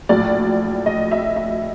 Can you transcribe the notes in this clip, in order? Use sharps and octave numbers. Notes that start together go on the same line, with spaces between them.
A#1 A2 F#3 D5
D#5
E5
E5